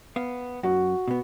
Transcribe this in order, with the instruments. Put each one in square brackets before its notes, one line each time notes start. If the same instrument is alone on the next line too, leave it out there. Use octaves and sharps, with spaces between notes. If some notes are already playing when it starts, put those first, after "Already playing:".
[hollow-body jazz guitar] B3 F5
[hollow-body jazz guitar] F#2 [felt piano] F#4
[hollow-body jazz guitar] B2 B3